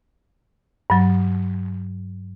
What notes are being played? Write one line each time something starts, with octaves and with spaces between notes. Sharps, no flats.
G2 F#3